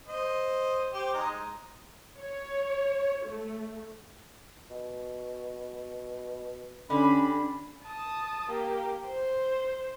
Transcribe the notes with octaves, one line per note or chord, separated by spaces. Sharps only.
C5 D#5
G4 C5
G#3 D#4
C#5
A3
B2
D3 G3 C#4 B5
A5 D#6
A#3 G4
C5